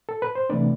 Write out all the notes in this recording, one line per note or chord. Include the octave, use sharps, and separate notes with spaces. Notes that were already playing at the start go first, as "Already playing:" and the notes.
A4
B4
C5
C3 E3 A3 D4 B4 D5